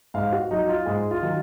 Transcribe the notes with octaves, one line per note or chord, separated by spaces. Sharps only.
G#2 F5
F#4
F#3 D#4
F4
G#2 G#4
F4
D#3 F#3